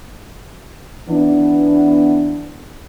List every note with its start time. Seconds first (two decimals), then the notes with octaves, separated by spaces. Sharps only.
1.08 E3 B3 D4